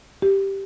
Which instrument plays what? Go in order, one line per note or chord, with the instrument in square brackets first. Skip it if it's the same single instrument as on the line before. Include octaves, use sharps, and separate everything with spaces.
[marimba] G4